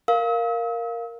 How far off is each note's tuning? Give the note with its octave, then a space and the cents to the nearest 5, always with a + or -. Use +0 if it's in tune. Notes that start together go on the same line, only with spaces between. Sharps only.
A#4 +0 F5 +0 E6 -45